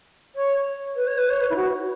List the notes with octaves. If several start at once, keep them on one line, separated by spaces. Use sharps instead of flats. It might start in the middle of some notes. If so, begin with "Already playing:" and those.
C#5
B4
C#5
B4
C#5
B4
E4
F#4